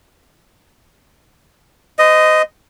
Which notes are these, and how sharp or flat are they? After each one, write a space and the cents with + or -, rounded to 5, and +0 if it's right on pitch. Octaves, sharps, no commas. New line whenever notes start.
C5 -40 D#5 +0